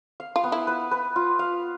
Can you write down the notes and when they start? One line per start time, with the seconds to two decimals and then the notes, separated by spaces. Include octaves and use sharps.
0.20 F5
0.36 F4
0.44 B3
0.52 E4
0.67 B4
0.91 B4
1.16 F4
1.39 F5